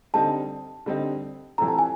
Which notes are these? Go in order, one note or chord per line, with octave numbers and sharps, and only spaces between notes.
D3 G3 C4 D#4 A5
D3 G3 C4 D#4
E3 G3 C4 F4 A4 A#5
A5
G#5